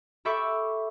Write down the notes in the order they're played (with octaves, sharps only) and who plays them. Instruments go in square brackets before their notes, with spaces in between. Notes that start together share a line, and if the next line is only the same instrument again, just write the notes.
[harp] G4 A4 E5 B5 C#6 D6